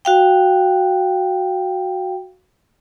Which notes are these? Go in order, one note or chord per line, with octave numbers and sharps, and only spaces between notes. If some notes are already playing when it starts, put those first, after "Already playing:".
F#4 F5 G5